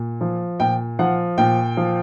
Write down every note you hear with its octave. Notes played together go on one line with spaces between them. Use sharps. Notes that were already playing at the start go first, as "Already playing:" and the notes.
Already playing: A#2
F3
A#2 G5
F3 F#5
A#2 G5
F3